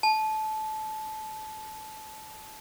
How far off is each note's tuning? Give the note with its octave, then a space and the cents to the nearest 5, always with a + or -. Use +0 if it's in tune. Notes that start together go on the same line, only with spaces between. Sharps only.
A5 -20